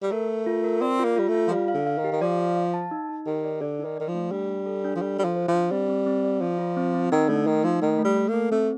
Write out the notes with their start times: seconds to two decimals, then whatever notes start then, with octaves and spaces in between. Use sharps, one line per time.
0.02 G3
0.12 A3 A#4
0.29 A#4
0.46 F4
0.64 A#4
0.81 C4 D5
0.99 F4
1.04 A#3
1.16 G3 F4
1.28 A3
1.34 F4
1.48 F3
1.51 G3 F5
1.68 F5
1.74 D3
1.87 F5
1.98 D#3
2.04 G4
2.12 D#3
2.21 F3 D5
2.39 F5
2.57 F5
2.74 A5
2.91 D#4
3.09 D#4
3.26 D#3 G4
3.44 D5
3.61 D3 D5
3.79 D#4
3.85 D#3
3.97 D#3 D5
4.08 F3
4.14 A3
4.32 G3 D4
4.49 D4
4.66 A4
4.84 D4
4.95 F3
5.02 G3 A4
5.19 G3 C5
5.25 F3
5.36 C5
5.48 F3
5.54 D4
5.71 G3 C4
5.89 C4
6.06 C4
6.24 D5
6.41 F3 D5
6.59 F4
6.76 C4
6.94 C4
7.12 D#3 D#4
7.29 D3 A3
7.46 D#3 D#4
7.64 F3 D#4
7.82 D#3 A3
7.99 A3
8.05 G3
8.17 A3
8.28 A#3
8.34 A4
8.52 A3 C4